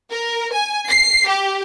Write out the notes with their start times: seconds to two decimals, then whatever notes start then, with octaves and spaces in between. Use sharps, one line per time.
0.10 A#4
0.54 G#5
0.88 C7
1.27 G4